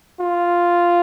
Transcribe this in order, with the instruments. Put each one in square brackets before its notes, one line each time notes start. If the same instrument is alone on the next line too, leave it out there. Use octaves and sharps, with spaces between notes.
[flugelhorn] F4